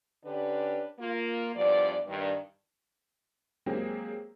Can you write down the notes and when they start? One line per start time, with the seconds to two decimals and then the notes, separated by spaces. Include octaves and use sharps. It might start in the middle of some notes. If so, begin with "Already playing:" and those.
0.24 D3 C#4 D4 G4 B4
1.00 A#3 F4
1.55 E2 G2 F3 D5
2.07 G2 D#3
3.66 F#3 G#3 A#3 C4 G4 G#4